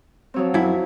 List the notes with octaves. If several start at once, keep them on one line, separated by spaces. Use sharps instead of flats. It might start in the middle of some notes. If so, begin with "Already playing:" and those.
F3 F#3 C4
F#2 E4